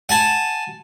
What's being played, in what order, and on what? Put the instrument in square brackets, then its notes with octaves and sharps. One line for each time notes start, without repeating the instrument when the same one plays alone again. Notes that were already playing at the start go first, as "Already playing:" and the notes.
[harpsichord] F#5 G#5 A5